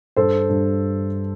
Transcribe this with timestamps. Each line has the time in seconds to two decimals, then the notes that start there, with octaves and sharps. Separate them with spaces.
0.16 G2 A4 C5
0.49 G2